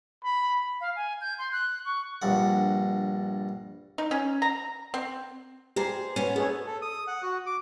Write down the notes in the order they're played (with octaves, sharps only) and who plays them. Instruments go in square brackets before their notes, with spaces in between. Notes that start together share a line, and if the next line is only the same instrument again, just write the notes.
[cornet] B5
[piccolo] F5
G#5
G6
C6
F#6
C#6
[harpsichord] A#1 G2 F#5
[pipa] D#4
C#4
A#5
C4
[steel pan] G4 A#5 [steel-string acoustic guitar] G#4 C5
[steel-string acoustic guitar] B3 C#4
[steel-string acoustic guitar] B3 [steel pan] G#4 A4 C#5
[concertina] A4
D#6
F#5
F#4
D6